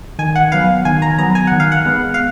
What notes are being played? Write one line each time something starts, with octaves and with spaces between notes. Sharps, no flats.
D#3 G#5
F#5
F#3 B3 F5
D#3 G#5
A#5
F#3 B3 A#5
G#5
D#3 F#5
F5
F#5
G#3 B3
F5